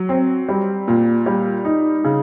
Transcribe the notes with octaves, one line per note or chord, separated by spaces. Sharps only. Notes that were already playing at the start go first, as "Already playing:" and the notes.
Already playing: F#3
C4
G3
A#2
G3
D#4
C#3